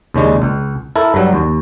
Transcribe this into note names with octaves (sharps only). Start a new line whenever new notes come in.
D#2 C#3 G#3 D4
C#2
E4 A4 A#4
G2 F#3 G3
D#2